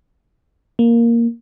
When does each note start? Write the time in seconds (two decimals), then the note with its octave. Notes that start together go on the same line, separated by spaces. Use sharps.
0.79 A#3